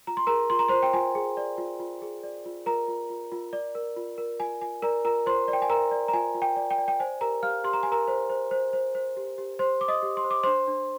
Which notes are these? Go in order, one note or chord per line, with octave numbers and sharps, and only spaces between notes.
F4 A#5
C6
G#4 A#4 A#5
F4 C6
A#5
F4 C5 C6
G5
F4 G#5
G#4
D5
F4
F4
G#4
D5
F4
F4 A#4 A#5
F4
F4
F4
D5
A#4
F4
A#4
F4 G#5
F4 G#5
A#4 D5 A#5
F4 A#4 A#5
F4 C5 C6
D5
G5
G#5
A#4 A#5
D5
A#5
F4 G#5
F4
G5
D5
G5
D5
G5
C5 G#5
G4 A#4 A#5
G4 F5 F6
G4 C6
A#5
G4 G#5
A#4 A#5
C5
C5
C5
C5
C5
G4
G4
C5 C6
C5 D6
D#5 D#6
G4
C6
C5
D6
D4 C5 C6
D4